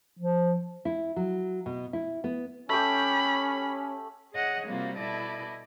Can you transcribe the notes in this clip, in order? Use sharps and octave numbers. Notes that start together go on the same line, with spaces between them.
F3
E4
F#3
B2
E4
B3
A3 C#4 G4 B5
G#4 C#5 D#5 F#5
C3 G3 A#3 C4 F4 F#4
B2 E4 A4 D5 D#5